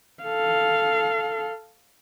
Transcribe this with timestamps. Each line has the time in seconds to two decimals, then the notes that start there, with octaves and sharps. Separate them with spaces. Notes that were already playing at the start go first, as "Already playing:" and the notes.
0.24 A4 F5